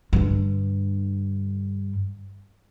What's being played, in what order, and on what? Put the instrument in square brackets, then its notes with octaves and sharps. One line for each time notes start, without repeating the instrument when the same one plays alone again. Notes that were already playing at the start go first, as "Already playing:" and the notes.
[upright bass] G2 D3